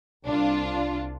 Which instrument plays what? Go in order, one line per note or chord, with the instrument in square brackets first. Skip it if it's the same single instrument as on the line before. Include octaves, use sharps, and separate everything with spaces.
[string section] C2 D4 F4